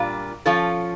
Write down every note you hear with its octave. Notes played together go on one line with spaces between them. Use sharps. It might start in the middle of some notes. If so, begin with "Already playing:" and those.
Already playing: A#2 G3 D4 F4
F3 C#4 F4 A4